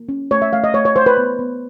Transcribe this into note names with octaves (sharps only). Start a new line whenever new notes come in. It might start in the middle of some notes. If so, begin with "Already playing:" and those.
Already playing: A#3
C#4
A3 C#5
E5
A3 F5
D#5
A3 C#5
C#5
A3 C5
B4
B3
B3